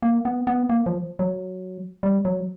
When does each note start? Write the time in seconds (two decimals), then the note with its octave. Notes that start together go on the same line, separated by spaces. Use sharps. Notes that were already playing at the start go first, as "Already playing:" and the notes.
0.02 A#3
0.25 B3
0.47 B3
0.69 A#3
0.86 F3
1.19 F#3
2.03 G3
2.25 F#3